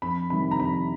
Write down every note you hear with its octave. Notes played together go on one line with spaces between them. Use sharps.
F2 B5
C3 D#3 G3 B5
A#5
F2 B5